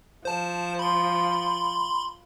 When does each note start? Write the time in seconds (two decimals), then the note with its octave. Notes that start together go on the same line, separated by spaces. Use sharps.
0.25 F3 C5 A5
0.79 B5 C6